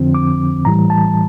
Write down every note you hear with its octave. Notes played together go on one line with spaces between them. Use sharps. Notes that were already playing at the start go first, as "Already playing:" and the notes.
Already playing: F2 D3 F3 C4
D6
A2 E3 G3 A#5
A5